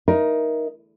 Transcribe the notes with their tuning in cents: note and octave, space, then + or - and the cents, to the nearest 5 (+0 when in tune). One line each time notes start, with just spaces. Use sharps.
D#4 +5 A#4 +15 E5 +10